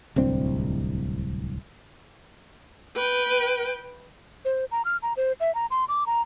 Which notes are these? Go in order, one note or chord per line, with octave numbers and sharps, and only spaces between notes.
D1 C2 C4 D4
B4 G5
C5
A#5
F6
A#5
C5
E5
A#5
C6
D6
A#5